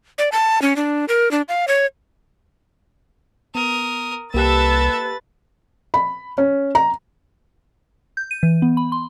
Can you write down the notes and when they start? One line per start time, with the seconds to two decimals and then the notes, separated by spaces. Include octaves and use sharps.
0.18 D5
0.32 A5
0.62 C#4
0.76 D4
1.08 A#4
1.31 D4
1.48 F5
1.68 C#5
3.55 B3 A#4 D#6
4.34 C2 A#3 G4 A4 B4 E5 F#6 A6
5.94 B5
6.38 C#4
6.75 A#5
8.17 G6
8.31 D#7
8.43 E3
8.62 B3
8.77 B5
8.92 C6